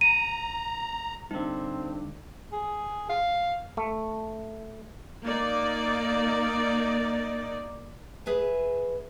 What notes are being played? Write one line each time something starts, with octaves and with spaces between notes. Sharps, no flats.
A#5 D#7
G2 D3 C4 D#4
G#4
F5
A3
A#3 D#4 D5
G#4 B4 E5 G#5